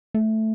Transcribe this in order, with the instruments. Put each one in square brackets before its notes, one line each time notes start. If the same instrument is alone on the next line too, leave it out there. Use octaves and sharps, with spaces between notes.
[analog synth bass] A3